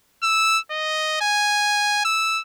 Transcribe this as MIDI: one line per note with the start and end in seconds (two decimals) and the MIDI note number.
0.23 0.58 88
0.71 1.20 75
1.21 2.02 80
2.05 2.41 88